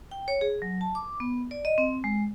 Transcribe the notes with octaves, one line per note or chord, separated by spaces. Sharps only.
G5
C#5
G#4
F#3
A5
D6
B3
D5
D#5
C4
G#3